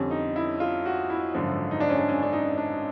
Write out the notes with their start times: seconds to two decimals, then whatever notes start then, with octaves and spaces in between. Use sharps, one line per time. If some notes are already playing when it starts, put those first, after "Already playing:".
Already playing: F2 D3 G3 C#4
0.11 D#4
0.36 E4
0.60 F4
0.86 F#4
1.10 E4
1.34 G#1 F#2 D3 F3
1.71 D#4
1.80 D4
1.89 C#4
1.98 D4
2.08 C#4
2.22 D4
2.33 D#4
2.58 D4